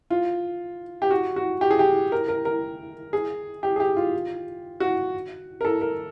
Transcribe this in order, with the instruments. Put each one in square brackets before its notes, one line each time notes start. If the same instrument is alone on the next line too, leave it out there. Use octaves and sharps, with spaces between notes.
[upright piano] F4
G4
F#4
F#4
G4
G#4
G4
A#4
A#4
A#4
G#4
G4
G#4
G4
F4
F#4
A#4
A4
A#4